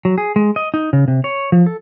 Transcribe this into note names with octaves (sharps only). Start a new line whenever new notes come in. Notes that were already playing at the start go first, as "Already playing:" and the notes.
F#3
G#4
G#3
D#5
D#4
C#3
C3
C#5
F3
A4